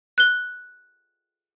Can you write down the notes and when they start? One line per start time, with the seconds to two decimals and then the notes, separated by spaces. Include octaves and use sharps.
0.18 F#6 G7